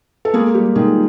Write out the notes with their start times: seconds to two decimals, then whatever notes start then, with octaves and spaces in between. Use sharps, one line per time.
0.25 A4
0.34 G#3 A#3 G#4
0.54 G3 G4
0.75 D#3 G#3 G#4